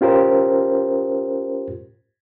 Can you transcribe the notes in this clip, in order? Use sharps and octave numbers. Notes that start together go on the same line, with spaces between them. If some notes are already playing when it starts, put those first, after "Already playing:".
C#4 F4 G4 A#4 C5